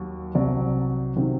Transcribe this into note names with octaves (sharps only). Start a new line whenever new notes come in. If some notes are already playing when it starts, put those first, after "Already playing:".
Already playing: D#2 F#3
C2 C3 F#3 D5
C3 D#3 F#3